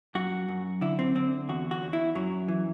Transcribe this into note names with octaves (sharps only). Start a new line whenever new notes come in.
F#2 F#4
F#2
D3 E4
C4
D3 C4
E2 F#4
F#4
E2
E4
F#2 F#3
E3